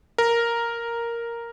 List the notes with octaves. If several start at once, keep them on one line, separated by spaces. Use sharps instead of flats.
A#4